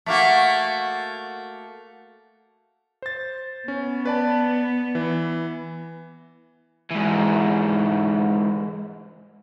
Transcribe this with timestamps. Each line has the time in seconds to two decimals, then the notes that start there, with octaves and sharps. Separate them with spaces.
0.06 A3 A#3 F#4
3.02 C5 A6
3.68 B3 C#4
4.05 B4 D5 A5
4.95 E3
6.91 G#2 E3